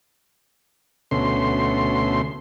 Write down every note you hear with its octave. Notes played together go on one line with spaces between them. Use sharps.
D2 B2 A3 C#4 C6